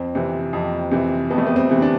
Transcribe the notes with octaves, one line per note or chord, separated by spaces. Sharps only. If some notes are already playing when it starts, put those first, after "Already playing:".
Already playing: F2 C4
C3 E3
F2
C3 E3
F2 B3
A3
B3
C4
C3 E3
D4